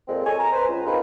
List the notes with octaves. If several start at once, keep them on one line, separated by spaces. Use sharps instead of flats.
F2 A#2 G#3 C4
A4 C#5 D#5 G#5
A#5
B4 C5
C#2
C4 D#4 F4 A#4 B4